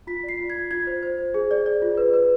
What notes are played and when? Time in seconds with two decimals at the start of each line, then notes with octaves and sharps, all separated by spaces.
0.07 F4 B6
0.23 D5
0.29 C7
0.39 F4
0.50 G#6
0.56 F4
0.71 F4 G#6
0.87 C5
1.03 C5
1.18 C5
1.34 G#4
1.51 D5
1.66 D5
1.82 F4
1.97 B4
2.14 B4